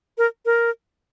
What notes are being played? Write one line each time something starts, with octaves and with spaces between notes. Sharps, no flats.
A#4
A#4